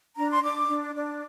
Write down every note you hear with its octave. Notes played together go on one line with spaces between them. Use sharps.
D4 A#5
C6
D4 D6
D4
D4